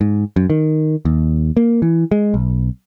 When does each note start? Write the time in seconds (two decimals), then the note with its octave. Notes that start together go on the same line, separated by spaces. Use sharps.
0.01 G#2
0.36 F#2
0.50 D#3
1.05 D#2
1.57 A#3
1.82 E3
2.11 G#3
2.34 B1